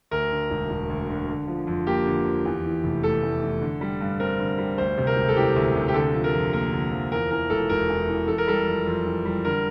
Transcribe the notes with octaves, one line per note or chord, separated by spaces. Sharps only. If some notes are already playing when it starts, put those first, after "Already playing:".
D2 A#4
D3
E1
E1
D2
D3
D3
F3
F2
A#3 G4
D3
F3
E2
E3
F1
A3 A4
E2
E3
D3
G3
G2
C4 A#4
D3
G3
D2 C5
C3
A#4
E1
A4
E3 G4
D2
C3
G4
D3 A4
F3
A#4
F2
A#3 A#4
D3
F3
E2 A#4
E3 A#4
E1 A4
E1 A#4
E2
E3
E3 A4
A#4
G3 A4
F2
F2
E3
G3
D3 A#4